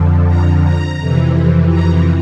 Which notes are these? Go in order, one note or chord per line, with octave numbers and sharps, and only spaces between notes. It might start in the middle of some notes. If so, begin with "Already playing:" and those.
Already playing: F2 D3 F3
A#5
A#5
F2 C3 E3
A#5